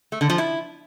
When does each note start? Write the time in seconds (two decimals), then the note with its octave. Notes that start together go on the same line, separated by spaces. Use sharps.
0.12 A3
0.21 D3
0.30 F3
0.38 E4